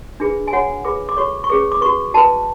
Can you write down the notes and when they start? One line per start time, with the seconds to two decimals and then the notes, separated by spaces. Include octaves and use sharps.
0.20 D4 F4 G#4 B4
0.48 G#5
0.53 D4 F#4 C#5 F#5
0.85 F4 G#4 B4 D6
1.09 D6
1.17 F#4 A4 C#5 C#6
1.44 C#6
1.50 C#4 G#4 B4 D6
1.72 D6
1.81 F#4 B4 C#6
2.14 F#4 B4 A5